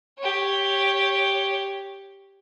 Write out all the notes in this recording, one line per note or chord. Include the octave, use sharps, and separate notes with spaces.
G4 C#5